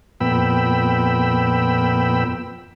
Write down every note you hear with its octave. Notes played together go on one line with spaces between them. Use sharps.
F2 A#2 B3 G5 B5 E6